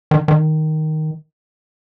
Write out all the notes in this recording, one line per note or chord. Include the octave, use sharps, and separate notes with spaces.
D#3
D#3